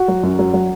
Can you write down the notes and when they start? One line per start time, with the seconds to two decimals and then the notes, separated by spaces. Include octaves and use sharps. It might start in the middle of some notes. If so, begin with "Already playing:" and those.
Already playing: F#4
0.08 F#3
0.23 F#2
0.39 F#3
0.53 F#3